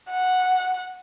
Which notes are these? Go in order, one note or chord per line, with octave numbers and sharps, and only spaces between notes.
F#5